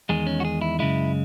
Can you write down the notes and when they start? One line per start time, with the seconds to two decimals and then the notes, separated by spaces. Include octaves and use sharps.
0.09 E2 D#3 G#3 G#4
0.27 C#4
0.40 F#4
0.45 G#4
0.61 E4
0.79 F#2 C#3 G#3 E4